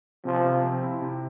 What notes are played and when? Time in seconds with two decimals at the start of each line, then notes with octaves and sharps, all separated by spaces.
0.25 C3 F3
0.44 C3
0.64 C4
0.83 E4
1.02 C3